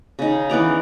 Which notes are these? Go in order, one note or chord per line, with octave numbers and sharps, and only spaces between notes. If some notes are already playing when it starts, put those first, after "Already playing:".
C#3 D#4
E3 B3 D5 A#5